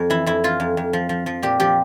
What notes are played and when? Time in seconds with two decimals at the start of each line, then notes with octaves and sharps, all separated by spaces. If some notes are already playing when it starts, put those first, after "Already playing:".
Already playing: F2
0.10 E3 E4
0.26 F2 E4
0.44 E3 F4
0.60 F2
0.77 F2
0.93 F3
1.09 F3
1.26 F3
1.42 A#2 G4
1.60 F3 G4